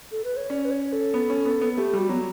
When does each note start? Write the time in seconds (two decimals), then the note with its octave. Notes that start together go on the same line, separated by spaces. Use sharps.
0.12 A4
0.24 B4
0.37 C#5
0.50 C#4 D5
0.65 B4
0.71 C#5
0.93 A4
1.14 B3
1.30 C#4
1.45 B3
1.61 B3
1.77 A3 G4
1.93 G3 F#4
2.09 F#3 B3